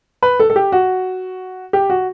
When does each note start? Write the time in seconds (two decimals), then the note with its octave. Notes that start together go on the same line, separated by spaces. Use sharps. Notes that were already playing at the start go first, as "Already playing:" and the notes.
0.23 B4
0.40 A4
0.50 A4
0.56 G4
0.72 F#4
1.73 G4
1.90 F#4